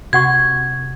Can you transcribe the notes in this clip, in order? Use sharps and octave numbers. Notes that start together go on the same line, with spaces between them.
C3 F#4 F#5 C#6 G#6